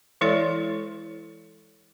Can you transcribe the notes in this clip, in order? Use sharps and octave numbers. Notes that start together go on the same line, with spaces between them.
E3 G#3 E4 A4 C#5 D5